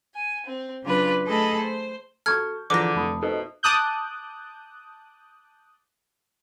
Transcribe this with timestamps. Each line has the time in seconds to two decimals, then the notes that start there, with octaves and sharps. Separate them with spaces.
0.14 G#5
0.46 C4
0.83 C#3 F#3 D4 F4 B4
1.25 A3 G#4 A4 D#5 A5 B5
1.59 C5
2.26 F#4 A4 A5 C#6 F6 G6 G#6
2.70 D3 E3 F3 G#4 A#5 D6 G6 A#6
2.95 F1 A5 B5 D#6
3.23 B2 D#4 A4 C5 E5
3.63 A5 D6 D#6 F#6 G6